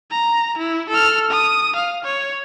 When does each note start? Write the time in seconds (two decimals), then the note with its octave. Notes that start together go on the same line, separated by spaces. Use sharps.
0.11 A#5
0.58 E4
0.89 A4 F6
1.30 D#6
1.76 F5
2.04 C#5